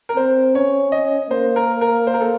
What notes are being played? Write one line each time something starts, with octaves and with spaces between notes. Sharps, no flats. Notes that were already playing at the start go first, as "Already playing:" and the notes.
A#4
C4 C5
C#4 C#5
D#5
A#3 C5
A#4
A#4
C5
A#4
A4